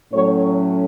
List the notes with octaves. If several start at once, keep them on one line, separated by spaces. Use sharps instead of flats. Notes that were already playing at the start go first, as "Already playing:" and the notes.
A2 F#3 A3 C#4 C#5
C#5